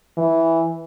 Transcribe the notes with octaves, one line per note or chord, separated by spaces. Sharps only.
E3